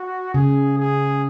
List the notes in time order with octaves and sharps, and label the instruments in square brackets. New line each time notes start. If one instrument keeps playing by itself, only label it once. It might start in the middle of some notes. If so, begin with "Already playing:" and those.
Already playing: [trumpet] F#4
[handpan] C#3 [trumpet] G#4
[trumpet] G#4